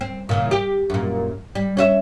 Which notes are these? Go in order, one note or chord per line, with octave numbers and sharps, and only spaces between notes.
C4
A#2 C#3 E3
G4
F#2 A#2
G3
C#4 F#4 E5